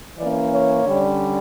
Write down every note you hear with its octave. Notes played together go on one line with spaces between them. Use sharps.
E3 A#3 C#4 D5
C#5
D3 G3 C#4